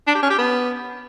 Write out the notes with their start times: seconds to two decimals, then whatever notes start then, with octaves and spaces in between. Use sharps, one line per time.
0.07 D4
0.15 G4
0.23 C#4
0.30 G4
0.38 B3